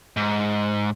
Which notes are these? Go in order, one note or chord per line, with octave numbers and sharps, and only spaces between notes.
G#2